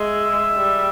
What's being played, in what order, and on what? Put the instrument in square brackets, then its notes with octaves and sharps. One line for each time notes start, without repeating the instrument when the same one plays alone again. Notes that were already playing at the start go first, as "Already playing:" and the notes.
Already playing: [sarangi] G#3 [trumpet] E5
[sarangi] G3